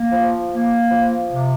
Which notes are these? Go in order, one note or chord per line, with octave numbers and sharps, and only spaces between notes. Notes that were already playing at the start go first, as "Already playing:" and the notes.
Already playing: A#3
F3
A#3
F3
C3